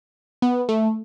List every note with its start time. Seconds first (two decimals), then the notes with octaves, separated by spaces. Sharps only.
0.42 B3
0.69 A3